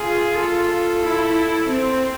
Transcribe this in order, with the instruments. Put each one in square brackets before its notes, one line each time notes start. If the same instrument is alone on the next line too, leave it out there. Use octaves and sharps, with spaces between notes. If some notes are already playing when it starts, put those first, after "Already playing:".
Already playing: [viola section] F4 [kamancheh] G#4
[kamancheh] A4
[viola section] E4
C4